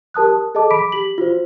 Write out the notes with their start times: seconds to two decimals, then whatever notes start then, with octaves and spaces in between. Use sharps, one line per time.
0.14 G4 A#4 A5 D#6 F#6
0.28 A5
0.55 G#4 A4 D#5 A5 D6
0.71 B5 D6 B6 D7
0.92 G4 B6 F#7
1.18 F4 F#4 C5